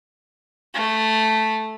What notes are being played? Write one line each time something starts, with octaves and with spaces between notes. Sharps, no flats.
A3